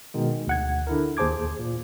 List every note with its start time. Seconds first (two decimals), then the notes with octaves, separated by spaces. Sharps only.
0.14 B2 D#3 G#3
0.47 D2 F#5 G#6
0.87 D3 E4 A#4
1.17 D#2 G#4 C5 A5 D6 G#6
1.59 A#2